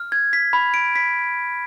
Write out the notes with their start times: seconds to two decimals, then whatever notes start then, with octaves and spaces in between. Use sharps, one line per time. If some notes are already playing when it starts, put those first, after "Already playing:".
Already playing: F6
0.12 G#6
0.33 B6
0.53 B5
0.74 D7
0.96 B6